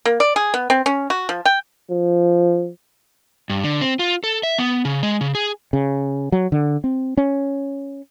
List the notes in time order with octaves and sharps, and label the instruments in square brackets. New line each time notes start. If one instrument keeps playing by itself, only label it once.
[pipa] A#3
D5
G#4
B3
C4
C#4
F#4
F3
G5
[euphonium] F3
[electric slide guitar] G2
D3
C4
F4
A4
E5
B3
C#3
G#3
C#3
G#4
[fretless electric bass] C#3
F#3
D3
C4
C#4